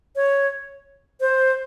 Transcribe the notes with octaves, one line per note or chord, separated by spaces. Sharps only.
C#5
C5